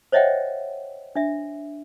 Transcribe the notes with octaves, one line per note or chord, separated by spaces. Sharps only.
C5 C#5 D#5 E5 F#5 G5
D4 E5